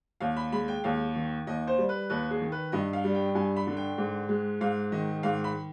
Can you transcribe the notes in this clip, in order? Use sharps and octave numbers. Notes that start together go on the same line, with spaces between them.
D#2 F5
B5
G#3 B5
G5
D#2 F5
D#3
D#2 D#5
C5
G3
B4
D#2 B4
G#4
D#3
B4
G2 D#5
F5
G3
G5
G2 G#5
B5
D3
G5
G#2
G#3
G#2 F5
D#3 D#5
G#2 F5
B5